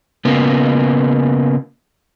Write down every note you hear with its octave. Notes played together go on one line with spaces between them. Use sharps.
C#3 A#3 B3